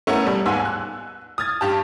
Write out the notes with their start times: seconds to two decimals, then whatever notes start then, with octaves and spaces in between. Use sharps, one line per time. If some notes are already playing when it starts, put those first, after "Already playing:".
0.07 A3 B3 C#4 E4 A#4
0.26 B2 G3
0.45 D#2 G#2 B3 G#5 E6
0.65 F#6
1.38 D#6 F6 G#6 A6
1.61 G2 G4 A5